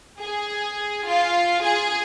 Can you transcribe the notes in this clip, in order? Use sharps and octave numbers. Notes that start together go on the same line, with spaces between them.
G#4
F4
G#4